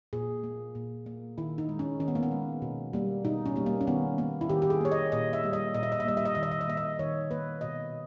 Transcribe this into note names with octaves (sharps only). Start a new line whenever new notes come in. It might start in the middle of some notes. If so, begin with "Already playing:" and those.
A#2 G#4
A#3
A#2
A#3
D#3 E4
D#4
G#3
C#4
D#3 C#4
B3
A#3
B3
G#3
B2
G3 A#3
B2 D#4
C#4
G3 A#3
A#3
C#4
D#3 B3
A#3
E4
D#3 G4
G4
G#4
A#3 C#5
D#5
A#2 D#5
E5
G3 A#3
D#5
A#2 D#5
E5
D#5
E5
G3 A#3 D#5
E5
D#5
D#3 E5
D#5
E5
D#5
A#3 E5
D#5
D#3 C#5
A#3 B4
B2 D#5